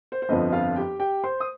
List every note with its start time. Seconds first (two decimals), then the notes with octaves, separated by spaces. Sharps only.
0.12 C5
0.22 C5
0.29 G1 F2 F3 D#5
0.52 F4 F5
0.76 G4 G5
1.00 G4 G5
1.24 C5 C6
1.40 D#6